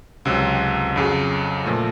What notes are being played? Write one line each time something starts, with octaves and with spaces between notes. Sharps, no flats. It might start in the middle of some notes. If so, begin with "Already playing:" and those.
C#2 C3 F#3 C4
F2 C#3 F#3
A#2 F3 A3